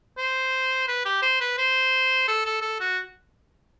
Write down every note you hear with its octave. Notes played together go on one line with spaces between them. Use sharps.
C5
B4
G4
C5
B4
C5
A4
A4
A4
F#4